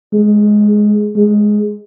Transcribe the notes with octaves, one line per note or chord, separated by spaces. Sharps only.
G#3
G#3